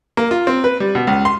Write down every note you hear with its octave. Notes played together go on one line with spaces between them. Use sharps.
A#3
F4
C4
B4
G3
B2
C#2
C6